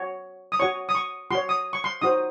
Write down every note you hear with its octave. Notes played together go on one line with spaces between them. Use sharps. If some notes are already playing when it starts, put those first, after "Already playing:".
Already playing: F#4 C#5
D#6
F#4 C#5 C#6
D#6
C#6
F#4 C#5 C6
D#6
C#6
C6
D#4 F#4 C5 D#6